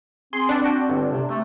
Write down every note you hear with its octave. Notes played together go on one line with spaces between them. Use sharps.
C4 G#4 C6
D4 A4 B4 F#5
F#4 G5
G1
C3
C3 A3